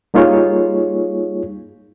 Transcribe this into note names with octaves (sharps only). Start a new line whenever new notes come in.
G3 A#3 D#4 F4 G#4 C#5